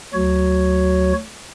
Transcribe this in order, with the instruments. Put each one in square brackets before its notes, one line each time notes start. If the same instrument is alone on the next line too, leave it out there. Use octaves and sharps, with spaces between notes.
[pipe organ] D2 F#3 F#4 C#5